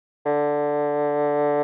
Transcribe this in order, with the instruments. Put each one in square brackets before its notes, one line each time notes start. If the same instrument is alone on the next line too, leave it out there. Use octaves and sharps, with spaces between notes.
[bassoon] D3